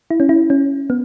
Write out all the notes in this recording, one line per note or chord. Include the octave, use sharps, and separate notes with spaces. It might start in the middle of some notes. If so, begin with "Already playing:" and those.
E4
C#4
E4
C#4
B3